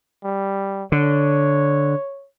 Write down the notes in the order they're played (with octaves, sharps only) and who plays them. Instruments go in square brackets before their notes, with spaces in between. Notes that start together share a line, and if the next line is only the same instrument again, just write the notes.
[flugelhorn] G3
[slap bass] D3 [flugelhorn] C#5